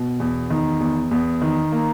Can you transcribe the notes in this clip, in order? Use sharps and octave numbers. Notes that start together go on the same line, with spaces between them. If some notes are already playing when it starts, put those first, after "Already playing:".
Already playing: B2
E2
D#3
E2
E2
D#3
A#3